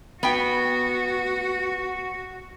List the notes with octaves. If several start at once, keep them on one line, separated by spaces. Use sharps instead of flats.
B3 F#4 G5